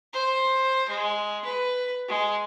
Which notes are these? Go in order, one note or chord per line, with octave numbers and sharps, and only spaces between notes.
C5
G#3
B4
G#3